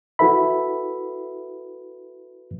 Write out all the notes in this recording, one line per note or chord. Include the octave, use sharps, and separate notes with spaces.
E4 F#4 A4 B4 E5 B5